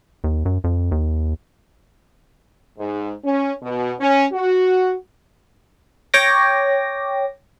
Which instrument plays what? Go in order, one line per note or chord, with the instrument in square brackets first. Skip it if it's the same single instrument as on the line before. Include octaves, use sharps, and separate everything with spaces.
[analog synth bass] D#2
F#2
F2
D#2
[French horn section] G#2
C#4
B2
C#4
F#4
[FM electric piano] C#5 G5 D6 A#6